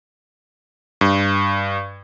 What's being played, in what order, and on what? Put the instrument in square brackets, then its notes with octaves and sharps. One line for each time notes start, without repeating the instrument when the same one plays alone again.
[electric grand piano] G2